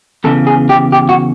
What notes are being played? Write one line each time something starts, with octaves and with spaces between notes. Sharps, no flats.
E2 C#3 E3 A4
G#4
G4
G4
F#4